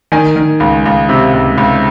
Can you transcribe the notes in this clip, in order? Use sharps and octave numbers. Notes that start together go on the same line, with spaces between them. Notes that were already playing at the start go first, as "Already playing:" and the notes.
D#3 G#5
D#3
C#2
C#2
C3
C#2
C#2